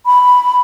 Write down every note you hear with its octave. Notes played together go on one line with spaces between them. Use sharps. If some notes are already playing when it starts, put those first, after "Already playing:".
B5